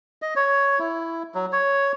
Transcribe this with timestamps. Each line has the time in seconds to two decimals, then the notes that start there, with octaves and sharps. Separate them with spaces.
0.22 D#5
0.36 C#5
0.79 E4
1.35 F#3
1.52 C#5